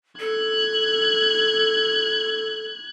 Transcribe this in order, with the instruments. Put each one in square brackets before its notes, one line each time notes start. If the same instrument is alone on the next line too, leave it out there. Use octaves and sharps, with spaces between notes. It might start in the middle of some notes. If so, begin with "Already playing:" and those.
[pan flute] A4 [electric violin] F#6 G#6